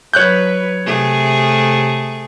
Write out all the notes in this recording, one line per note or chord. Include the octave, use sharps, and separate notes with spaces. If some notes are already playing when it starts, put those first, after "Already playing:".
F#3 B4 C#5 F#6 G6
C3 A3 G#4